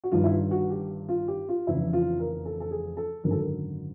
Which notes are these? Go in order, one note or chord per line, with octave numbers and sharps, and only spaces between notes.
F#4
G1 G2 D#3 G3 F4
E4
F4
F#4
G4
F4
G4
F4
F1 E2 C#3 E4
F4
A#4
A4
A4
G#4
A4
G#1 F#2 D3 F#3 A#4
A4
A#4